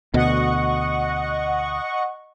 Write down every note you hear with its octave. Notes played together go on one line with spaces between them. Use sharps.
D2 B2 D#5 F#5 C#6